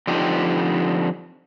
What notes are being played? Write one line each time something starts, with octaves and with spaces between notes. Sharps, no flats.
D3 F3 C4 D#4 G4